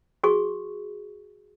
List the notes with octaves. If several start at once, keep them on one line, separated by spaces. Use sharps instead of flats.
F#4 G#4 C#6